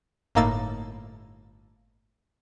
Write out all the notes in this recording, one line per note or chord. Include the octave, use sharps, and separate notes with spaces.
G1 A2 A#3 D#4 E6 A6